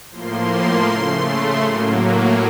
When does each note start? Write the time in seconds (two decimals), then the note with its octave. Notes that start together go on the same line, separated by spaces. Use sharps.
0.11 A2 F3 A#3 C6
0.86 C#3 A3
1.62 A2 F#3 A#3